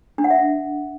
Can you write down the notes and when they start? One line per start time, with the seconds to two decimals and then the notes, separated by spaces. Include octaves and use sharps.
0.18 D4
0.24 F#5
0.30 E5